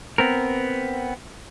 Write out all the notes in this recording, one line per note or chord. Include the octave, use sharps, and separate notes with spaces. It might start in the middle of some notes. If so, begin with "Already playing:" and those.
B3 C4 A#4